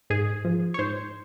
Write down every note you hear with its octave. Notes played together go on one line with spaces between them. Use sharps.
G#2 G#4
F3
C#5
G#2 C5